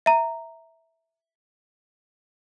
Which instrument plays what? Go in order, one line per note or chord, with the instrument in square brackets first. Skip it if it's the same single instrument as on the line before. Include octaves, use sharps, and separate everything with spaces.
[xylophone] E5 A#5